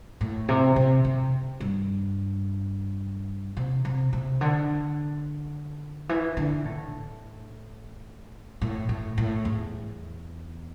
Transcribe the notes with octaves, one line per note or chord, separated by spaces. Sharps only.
A2
C3
C3
C3
G2
C3
C3
C3
D3
E3
D3
A2
A2
A2
A2
E2